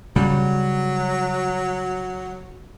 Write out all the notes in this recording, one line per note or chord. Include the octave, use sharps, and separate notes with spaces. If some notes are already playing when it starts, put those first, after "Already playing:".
C#3 F#3 G3